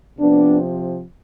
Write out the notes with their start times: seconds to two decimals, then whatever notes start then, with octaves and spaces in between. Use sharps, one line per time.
0.18 C3 F3 B3 D4